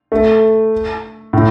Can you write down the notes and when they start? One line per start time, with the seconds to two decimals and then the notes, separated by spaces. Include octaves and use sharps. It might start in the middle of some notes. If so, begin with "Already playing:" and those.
0.12 A3
1.33 A2